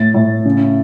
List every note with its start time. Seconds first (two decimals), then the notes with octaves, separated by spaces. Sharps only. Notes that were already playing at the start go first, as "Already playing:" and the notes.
Already playing: A2 A6
0.14 A2
0.45 C#3